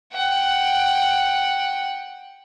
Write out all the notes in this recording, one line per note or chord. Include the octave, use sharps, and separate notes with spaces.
F#5 G5